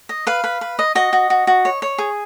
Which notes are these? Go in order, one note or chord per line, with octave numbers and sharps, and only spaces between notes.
D#5
B4 F5
B4
B4
D#5
F#4 D#5
F#4
F#4
F#4
C#5
C#5
G#4